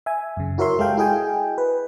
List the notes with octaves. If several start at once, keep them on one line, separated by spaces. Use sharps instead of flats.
E5 G#5
F#2 C#3
E4 F#4 A#4 C#5 E5 C6
G#3 G4 A4 F5 G5
E4 F#4 G#4 D#5 G5 G#5
B4